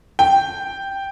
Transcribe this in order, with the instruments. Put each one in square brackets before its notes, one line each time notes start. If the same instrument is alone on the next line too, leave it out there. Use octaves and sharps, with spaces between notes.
[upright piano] G5